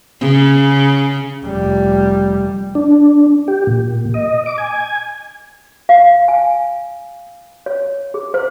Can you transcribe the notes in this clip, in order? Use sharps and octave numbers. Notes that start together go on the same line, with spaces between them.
C#3
F1 G3
D4
G4
A#2
D#5
D6
G#5
F5
G#5
C#5
G#4
C5